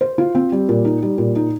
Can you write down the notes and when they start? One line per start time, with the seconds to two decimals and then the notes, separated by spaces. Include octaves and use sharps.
0.01 C5
0.18 F4
0.35 C4
0.52 G3
0.69 A#2
0.85 D#4
1.03 G3
1.18 A#2
1.36 D#4